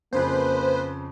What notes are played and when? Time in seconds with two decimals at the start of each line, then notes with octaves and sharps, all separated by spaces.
0.13 F2 C#3 F3 A#3 B4 C5